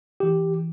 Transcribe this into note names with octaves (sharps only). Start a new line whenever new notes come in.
E3 G4